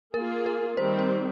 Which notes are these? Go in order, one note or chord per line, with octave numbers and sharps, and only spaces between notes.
A#3 F4 G#4 A#4
A#4
D#3 G3 C4 C5
C5